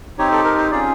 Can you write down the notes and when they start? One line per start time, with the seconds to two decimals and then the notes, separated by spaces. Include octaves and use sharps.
0.19 C4 D#4 G4 C#5
0.32 A4
0.44 A#4
0.58 C5
0.71 C#4 F4 G#4 D5